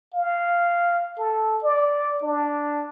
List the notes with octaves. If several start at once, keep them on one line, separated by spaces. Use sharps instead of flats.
F5
A4
D5
D4